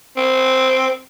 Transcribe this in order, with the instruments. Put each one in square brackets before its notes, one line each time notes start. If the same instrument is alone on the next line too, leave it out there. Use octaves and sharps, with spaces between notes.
[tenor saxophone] C4